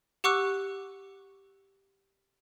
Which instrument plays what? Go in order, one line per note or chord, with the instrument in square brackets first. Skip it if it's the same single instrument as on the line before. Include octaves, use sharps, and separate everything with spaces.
[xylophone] G4 F#5 C#6 D6 E6 F#6